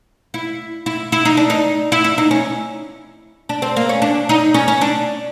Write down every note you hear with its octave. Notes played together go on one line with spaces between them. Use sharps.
E4
E4
E4
D#4
D4
D#4
E4
E4
D#4
C#4
D4
C4
A#3
C#4
D4
D#4
C#4
C#4
D4